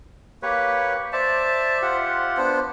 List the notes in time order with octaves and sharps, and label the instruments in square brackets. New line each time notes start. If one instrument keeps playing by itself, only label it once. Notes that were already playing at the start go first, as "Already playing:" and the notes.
[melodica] A#3 [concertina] G4 B4 C#5
[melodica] C5 E5 [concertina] D5 A5
[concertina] F4 G4 F#5
[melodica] B3 D4 C5